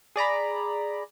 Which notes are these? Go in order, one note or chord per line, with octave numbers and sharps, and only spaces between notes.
G#4 D5 A#5 B5